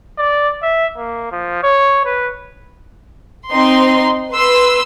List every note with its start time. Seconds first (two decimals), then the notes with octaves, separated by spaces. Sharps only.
0.18 D5
0.63 E5
0.97 A#3
1.32 F3
1.63 C#5
2.05 B4
3.49 C4 D#4 C6
4.30 B4 C6 E6